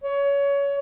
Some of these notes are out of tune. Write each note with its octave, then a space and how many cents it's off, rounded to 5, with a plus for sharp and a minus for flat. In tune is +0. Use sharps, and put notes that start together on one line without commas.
C#5 +25